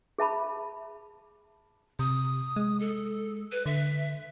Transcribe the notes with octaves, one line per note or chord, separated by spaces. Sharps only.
G#4 E5 A5 B5
C3 D#6
G#3
A4
B4
D3 E5